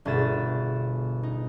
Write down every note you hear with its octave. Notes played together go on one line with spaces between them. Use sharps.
G1 B2 G#4 E5 A6 E7
D#4